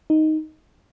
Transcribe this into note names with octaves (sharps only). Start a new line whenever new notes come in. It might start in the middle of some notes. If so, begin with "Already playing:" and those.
D#4